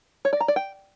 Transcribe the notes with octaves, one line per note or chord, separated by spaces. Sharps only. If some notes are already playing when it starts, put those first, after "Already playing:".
C#5
D5
A#5
D5
G5